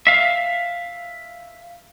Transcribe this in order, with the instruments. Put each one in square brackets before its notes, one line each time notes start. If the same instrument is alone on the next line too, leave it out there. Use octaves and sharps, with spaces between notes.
[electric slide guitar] E5 F5